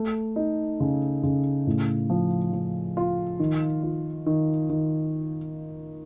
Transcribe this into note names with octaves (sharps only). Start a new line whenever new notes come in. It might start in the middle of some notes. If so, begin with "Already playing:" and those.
Already playing: A3
D#4
C#3
C#3
A2
F3
F3
F4
D#3
F4
D#3
D#3